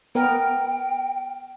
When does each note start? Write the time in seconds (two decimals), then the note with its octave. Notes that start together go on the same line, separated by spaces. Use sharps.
0.15 B3 A#4 G5